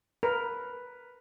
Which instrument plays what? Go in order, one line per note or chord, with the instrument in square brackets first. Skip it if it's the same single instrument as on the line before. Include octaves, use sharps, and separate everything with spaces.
[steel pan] A#4 [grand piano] B4